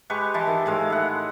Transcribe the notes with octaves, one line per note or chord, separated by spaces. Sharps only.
G#3 G4 B4 C#6
E3 D#5 A5 C6
D#3
A2 G#3 F5
E4 F#5